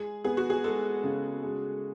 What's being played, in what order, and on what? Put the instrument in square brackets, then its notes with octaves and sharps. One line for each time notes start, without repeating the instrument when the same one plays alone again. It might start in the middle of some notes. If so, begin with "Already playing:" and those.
Already playing: [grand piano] G#3 [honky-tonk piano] G#4
[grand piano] B3 [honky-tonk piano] G#4
[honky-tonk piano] F#4
G#4
[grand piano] G#3 [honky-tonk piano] A4
[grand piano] C#3
G#3